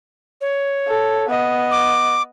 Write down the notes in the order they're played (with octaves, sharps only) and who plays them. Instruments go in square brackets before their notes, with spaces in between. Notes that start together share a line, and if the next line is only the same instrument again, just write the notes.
[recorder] C#5
[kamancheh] A4
B3 D#5
[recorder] D6